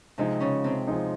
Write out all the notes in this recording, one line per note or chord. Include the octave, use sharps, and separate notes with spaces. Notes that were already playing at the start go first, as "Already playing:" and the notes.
C3 F3 G#3 C4 D#4
C#3 C#4
C3 C4
F3 G#3 D#4